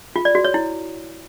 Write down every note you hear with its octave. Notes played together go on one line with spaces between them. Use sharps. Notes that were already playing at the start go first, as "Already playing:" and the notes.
F4
D5
F#4
C#5
E4